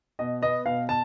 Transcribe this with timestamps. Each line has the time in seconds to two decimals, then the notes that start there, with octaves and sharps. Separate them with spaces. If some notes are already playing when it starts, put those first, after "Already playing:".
0.19 B2 D#5
0.42 B3 D#5
0.66 B2 F5
0.89 A5